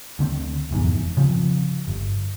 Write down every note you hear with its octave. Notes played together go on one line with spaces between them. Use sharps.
D2 D3 C4
F1 E2 G#2
C#3 F3 C4
G1